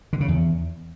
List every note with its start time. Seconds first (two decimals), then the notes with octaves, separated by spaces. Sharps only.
0.13 D3
0.21 C#3
0.28 E2